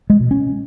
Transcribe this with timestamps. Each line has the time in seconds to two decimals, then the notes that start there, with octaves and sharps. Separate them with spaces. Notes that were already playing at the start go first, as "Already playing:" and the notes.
0.10 G#3
0.20 B2
0.31 C#4